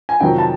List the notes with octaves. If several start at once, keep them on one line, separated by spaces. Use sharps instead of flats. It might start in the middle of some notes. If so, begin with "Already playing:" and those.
G#5
F2 C3 D#3 F#3 G5
A5